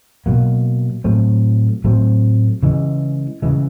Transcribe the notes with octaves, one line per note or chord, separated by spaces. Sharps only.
B2 F#3 A#3
A2 F#3 A3 C4
A2 F#3 A3 C4
C#3 E3 G#3
C#3 E3 G#3